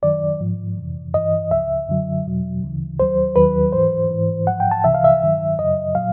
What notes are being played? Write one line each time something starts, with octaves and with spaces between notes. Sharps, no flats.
F#2 D#3 F#3 D5
G#2 F3
F2 C3 E3
G2 E3 D#5
C#2 C#3 F3 E5
F#2 D3 F#3
E2 B2 F#3
D2 C#3 E3
D#2 D#3 F#3 C5
D#2 D#3 F#3 B4
G#2 E3 C5
G#2 E3
G#2 F3 F#5
G5
A5
C2 C3 E3 E5
F5
E5
G2 D#3 F#3
F#2 C#3 F#3 D#5
A#2 F#3 F5